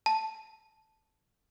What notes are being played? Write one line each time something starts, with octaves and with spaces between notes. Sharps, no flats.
A5